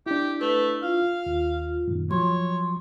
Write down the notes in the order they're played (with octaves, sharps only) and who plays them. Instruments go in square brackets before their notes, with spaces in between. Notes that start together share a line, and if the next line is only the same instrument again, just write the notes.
[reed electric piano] D4 E4 [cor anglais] G4
[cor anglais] A3 [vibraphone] B4
[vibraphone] F4 [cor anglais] F5
[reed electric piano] D#2
F#2 A#2 D#3
[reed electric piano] F3 F#3 [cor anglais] C#5 [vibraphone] C6